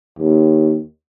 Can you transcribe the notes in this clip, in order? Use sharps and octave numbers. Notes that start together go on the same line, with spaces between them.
D#2